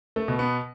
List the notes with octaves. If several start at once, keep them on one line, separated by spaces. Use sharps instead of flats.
A3
B2
B3